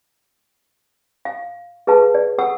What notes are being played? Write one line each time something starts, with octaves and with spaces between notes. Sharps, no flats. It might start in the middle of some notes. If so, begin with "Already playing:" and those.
F5
G#4 B4 F5 A5
D5
A4 F#5 E6